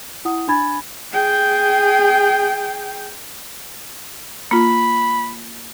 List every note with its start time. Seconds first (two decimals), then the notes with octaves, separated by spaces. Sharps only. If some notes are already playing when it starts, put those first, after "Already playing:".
0.25 E4 F#5 D#6
0.48 D4 G#5 B5 G#6 A6
1.13 G#4 G5
4.51 A#3 F4 B5